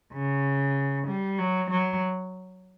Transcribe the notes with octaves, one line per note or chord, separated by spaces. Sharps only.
C#3
G3
F#3
F#3